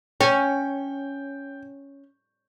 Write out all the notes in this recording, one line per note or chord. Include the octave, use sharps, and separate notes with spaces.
C#4 G5